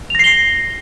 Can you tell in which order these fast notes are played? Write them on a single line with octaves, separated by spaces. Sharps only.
F7 A#6 C7 G7